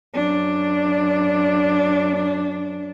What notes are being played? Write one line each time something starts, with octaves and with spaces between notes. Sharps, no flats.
F#2 D4